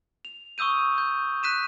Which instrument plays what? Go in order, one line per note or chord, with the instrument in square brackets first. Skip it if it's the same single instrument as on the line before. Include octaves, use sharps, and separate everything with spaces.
[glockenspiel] F7
C#6 D#6 E6 G6 D#7
G6
F#6 B6 D#7 E7